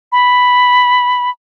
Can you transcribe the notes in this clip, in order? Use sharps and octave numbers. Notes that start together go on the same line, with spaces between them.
B5